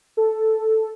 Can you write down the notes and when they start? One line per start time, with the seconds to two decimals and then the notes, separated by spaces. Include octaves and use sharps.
0.17 A4